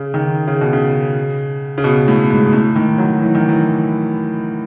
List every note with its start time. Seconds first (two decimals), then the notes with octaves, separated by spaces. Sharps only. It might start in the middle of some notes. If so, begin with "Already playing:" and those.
Already playing: C#3
0.14 D#3
0.47 C#3
0.61 B2
0.73 C#3
1.78 C#3
1.84 B2
2.08 A2
2.30 G#2
2.53 A2
2.76 D#3
2.98 F#3
3.21 E3
3.35 D#3
3.48 E3